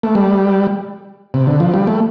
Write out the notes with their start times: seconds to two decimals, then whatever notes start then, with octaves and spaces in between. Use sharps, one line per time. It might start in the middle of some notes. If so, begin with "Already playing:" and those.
0.03 A3
0.15 G3
1.34 C3
1.47 D3
1.60 F3
1.74 G3
1.87 A3